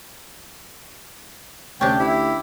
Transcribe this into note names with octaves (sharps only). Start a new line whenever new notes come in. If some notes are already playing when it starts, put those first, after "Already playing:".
D2 C3 C#4 D4 G5
E4 G4